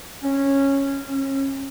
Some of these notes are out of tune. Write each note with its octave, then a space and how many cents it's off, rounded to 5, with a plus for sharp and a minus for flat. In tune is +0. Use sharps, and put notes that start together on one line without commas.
C#4 -10
C#4 -30